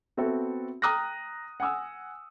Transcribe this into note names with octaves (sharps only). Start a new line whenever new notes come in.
B3 C4 F#4 A4 E5
G5 A#5 D#6 F6 F#6 A#6
F#5 G#5 D#6 E6